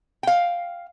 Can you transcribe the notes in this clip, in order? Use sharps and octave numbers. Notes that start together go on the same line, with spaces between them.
F5 G5